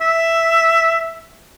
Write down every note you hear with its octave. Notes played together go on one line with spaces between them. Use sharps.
E5